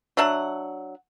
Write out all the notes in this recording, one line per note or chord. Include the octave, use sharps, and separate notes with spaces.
F#3 D4 E5 F#5